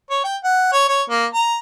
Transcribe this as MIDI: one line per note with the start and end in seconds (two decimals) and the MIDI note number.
0.10 0.20 73
0.24 0.36 79
0.44 0.72 78
0.73 0.87 73
0.89 1.02 73
1.10 1.26 58
1.34 1.57 82